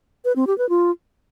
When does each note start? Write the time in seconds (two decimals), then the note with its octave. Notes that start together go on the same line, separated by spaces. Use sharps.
0.25 B4
0.36 C4
0.47 G4
0.58 B4
0.69 F4